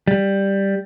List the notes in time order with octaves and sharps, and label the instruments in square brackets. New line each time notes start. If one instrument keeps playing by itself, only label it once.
[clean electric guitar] G3